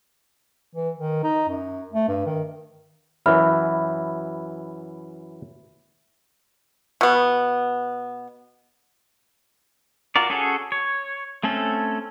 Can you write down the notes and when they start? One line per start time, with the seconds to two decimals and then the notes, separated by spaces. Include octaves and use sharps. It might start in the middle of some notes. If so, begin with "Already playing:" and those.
0.75 E3
0.96 D#3
1.23 D#4
1.48 F#2
1.93 A3
2.08 G2
2.26 D#3
3.26 F#2 E3 E5 B5 F6
7.01 B2 B3
10.16 F4 F#4 A#4 D5
10.30 C#4 F#4 G#4 A4 C#5
10.72 C#5
11.43 A3 C4 C#4 A4